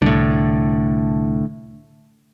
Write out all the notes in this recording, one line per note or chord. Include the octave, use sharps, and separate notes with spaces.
C2 A2 D3